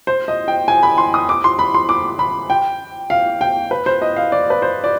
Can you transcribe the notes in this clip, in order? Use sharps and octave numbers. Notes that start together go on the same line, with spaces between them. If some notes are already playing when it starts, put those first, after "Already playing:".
C5
D#5
G5
G#5
B5
C6
D#6
D6
C6
B5
C6
D6
B5
G5
F5
G5
B4
C5
D#5
F5
D5
B4
C5
D5